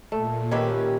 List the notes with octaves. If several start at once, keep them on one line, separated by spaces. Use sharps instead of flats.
A#2 A3
D#3 C#4 G4 B4 E5